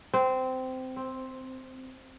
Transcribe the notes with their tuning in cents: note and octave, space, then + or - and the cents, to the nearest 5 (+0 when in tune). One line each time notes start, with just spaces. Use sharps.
C4 -15
C4 +5